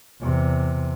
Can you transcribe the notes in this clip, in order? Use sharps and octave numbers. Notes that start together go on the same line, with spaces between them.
E2 C3